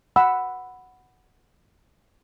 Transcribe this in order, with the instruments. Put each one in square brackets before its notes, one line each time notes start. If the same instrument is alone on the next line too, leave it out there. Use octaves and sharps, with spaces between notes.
[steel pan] F#5 B5 E6